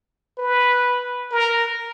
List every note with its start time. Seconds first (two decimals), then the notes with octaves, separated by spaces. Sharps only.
0.38 B4
1.32 A#4